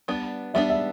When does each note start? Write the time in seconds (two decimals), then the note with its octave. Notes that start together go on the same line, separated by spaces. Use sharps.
0.08 G3 B3 D4
0.54 G3 B3 D4 E5
0.69 E5